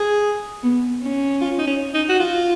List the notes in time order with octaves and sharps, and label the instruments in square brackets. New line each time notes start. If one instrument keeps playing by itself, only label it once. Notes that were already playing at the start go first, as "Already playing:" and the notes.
Already playing: [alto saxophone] G#4
[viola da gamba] B3
C#4
[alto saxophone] F4
D#4
C#4
D#4
F#4
F4